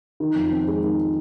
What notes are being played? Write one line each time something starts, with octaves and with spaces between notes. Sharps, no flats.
D#3
F2
C4
G#3
D#3